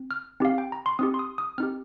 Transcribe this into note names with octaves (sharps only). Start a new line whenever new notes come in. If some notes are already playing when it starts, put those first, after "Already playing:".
Already playing: C4
F6
C4 D#4 G4 F5
G5
A#5
C6
C4 D#4 G4 D#6
C6
D#6
D#6
C4 D#4 G4 F6